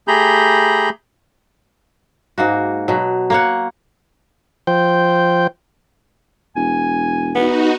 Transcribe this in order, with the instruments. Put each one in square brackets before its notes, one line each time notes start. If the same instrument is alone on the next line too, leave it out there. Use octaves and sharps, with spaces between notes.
[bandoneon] A3 G4 G#4 A#5 B5 G6
[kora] G#2 A#3 F#4
B2 F#3
A#3 C#5 F#5
[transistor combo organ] F3 C5 G5
[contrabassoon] E1 [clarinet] G#5
[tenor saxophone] B3 [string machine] D#4 F#4